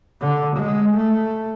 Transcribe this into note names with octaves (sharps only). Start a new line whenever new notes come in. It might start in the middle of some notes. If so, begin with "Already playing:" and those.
D3
G#3
A3